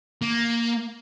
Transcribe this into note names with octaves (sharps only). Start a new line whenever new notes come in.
A#3